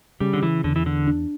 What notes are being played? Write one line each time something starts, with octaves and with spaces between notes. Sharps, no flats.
C#3 G3
D3
E3
E2 D3
E3
D3
D4